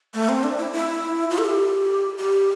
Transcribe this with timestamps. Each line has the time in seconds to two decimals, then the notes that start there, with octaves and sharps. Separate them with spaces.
0.14 A3
0.29 C4
0.44 D4
0.58 E4
0.73 E4
1.31 F4
1.38 A4
1.45 G4
2.18 G4